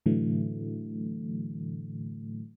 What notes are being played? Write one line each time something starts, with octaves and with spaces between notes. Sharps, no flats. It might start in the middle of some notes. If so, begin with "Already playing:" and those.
A2 D3 E3 F#3 A3